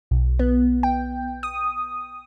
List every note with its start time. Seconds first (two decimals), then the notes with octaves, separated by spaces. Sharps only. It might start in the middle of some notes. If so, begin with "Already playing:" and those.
0.11 B1
0.39 B3
0.83 G5
1.43 D#6